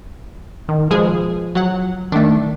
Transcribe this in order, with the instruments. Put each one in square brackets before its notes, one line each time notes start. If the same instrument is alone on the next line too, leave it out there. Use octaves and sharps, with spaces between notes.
[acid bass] D#3
[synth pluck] B2 G#3 G#4 [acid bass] F3
[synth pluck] F#3 F#5
[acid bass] D#3 [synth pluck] A3 D4